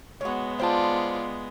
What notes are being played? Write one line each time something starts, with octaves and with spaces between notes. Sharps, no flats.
G#3 B3 F#4 C#5
F4 C5 D5 G5 A5